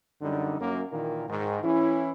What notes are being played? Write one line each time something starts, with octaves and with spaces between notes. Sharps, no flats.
F#2 D3 G3 D#4
F#2 A#3
A#2 D#3 E3 A#3
G#2 D#3
E3 C#4 E4